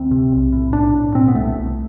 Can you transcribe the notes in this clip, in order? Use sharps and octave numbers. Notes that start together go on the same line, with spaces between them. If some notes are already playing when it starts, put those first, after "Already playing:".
Already playing: D2 C4
C3
B1
A2
B1 D4
A2
B2 C4
B3
C2 A3
C2